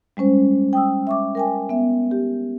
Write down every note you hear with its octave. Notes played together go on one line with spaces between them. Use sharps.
G3 G#3 C#4 C5
G5 D#6 E6
E5 C#6 D6
A#4 G5 G#5
B3 E5
G4